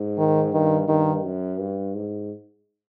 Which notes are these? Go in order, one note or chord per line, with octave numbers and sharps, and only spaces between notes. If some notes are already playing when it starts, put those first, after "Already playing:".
Already playing: G#2
D#3
G2 D#3
G2 D#3
F#2
G2
G#2